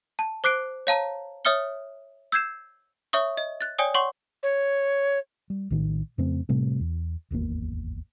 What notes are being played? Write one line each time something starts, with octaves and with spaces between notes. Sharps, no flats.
A5
C5 D6 F#6 C7 D7
C#5 F5 A5 A#5
C#5 E5 D#6 F6 C#7 G7
E6 G6 G#6 C7 E7
C#5 E5 C#6 D#6
D#5
F#6 A6
C#5 D5 G5 G#5 D#6 G7
C#5 F#5 C6 C#6
C#5
G3
A#1 A2 D#3
F2 C#3 A3 C4
A2 C3 G3 A3
E2
D1 G#1 E2 A#3